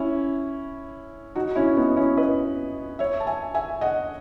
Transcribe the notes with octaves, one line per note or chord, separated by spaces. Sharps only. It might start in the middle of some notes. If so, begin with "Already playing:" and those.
Already playing: C#4 E4
D#4 F#4
C#4 E4
B3 D#4
C#4 E4
B4 D#5
C#5 E5
A5
E5 G#5
E5 G#5
D#5 F#5